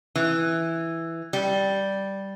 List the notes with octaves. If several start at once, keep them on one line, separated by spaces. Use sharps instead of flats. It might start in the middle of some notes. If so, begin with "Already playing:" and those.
E3
G3